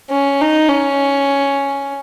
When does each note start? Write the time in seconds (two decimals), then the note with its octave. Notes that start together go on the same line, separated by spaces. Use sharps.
0.11 C#4
0.41 D#4
0.69 C#4